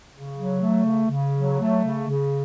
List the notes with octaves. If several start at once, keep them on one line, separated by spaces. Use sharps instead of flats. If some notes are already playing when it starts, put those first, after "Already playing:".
C#3
F#3
A3
C#3
C#3
F#3
A3
C#3
C#3